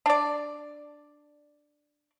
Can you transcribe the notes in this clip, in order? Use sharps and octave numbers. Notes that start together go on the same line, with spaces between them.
D4 D5